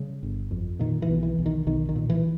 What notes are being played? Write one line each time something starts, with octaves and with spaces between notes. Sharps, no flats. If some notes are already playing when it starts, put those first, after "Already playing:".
Already playing: C#3 G3
G1
F2
A#2 D#3
E3
B1
E3
B1
D#3
B1 D#3
D#3
A#2
E3